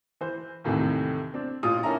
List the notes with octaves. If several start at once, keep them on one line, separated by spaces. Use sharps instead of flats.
E3 C5
D#2 A2 C3 D#3 E3
C4 D4
A1 A#2 F4 D#6
A#3 C#4 D#4 E4 A5 A#5